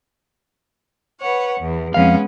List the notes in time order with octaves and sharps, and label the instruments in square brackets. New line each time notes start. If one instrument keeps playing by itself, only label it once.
[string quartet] B4 C#5 F#5
E2
[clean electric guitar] F2 F5 [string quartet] G#3 B3 C#4